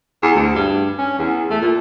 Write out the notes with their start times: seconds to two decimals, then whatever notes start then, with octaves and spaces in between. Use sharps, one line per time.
0.22 E2
0.35 D2
0.55 G2
0.98 C#4
1.19 E2
1.50 A3
1.62 A#2